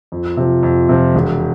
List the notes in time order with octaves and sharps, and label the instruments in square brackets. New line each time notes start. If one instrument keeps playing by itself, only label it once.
[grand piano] F2
C3 F3
F2
C3 F3
E1